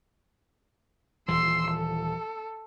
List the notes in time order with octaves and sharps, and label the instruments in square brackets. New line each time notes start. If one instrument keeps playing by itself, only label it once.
[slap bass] D#1 E3 F3 [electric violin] C6 E6
[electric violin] A4